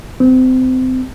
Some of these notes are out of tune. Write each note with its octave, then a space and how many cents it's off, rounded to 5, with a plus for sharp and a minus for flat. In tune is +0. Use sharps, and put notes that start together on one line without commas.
C4 -30